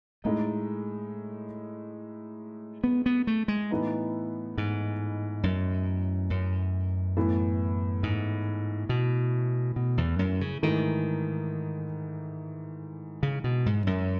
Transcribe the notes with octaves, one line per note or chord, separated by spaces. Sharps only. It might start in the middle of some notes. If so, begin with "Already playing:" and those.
A2 G#3 A3 D#4
B3
B3
A3
G#3
A2 E3 B3 D#4
G#2
F#2
F#2
A2 E3 B3
G#2
B2
B2
E2
F#2
C#3
G#2 D#3 E3 A3
C#3
B2
G#2
F#2